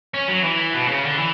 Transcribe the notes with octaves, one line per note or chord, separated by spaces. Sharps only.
C#4
F#3
E3
B2
C#3
D3
E3